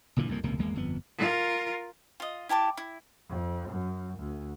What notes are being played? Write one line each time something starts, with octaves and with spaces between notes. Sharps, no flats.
F#1 A#2 D3 E3
F#1 C2 F2 A#3
D#1 C#2 C3 A#3
G#1 E2 G#3 A#3
G1 F2 B3
F4 A#4
F4 D#5
E4 G4 A5 D6
E4
F2
F#2
D2